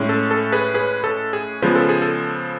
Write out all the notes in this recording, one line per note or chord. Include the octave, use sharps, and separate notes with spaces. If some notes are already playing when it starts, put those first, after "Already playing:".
Already playing: A2 G#3 C#4
A4
A4
G#4 B4
G#4 B4
A4
G#4
C#3 F3 G#3 B3 B4
A4
G#4
A4